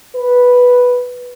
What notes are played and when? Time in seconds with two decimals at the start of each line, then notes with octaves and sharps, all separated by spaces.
0.16 B4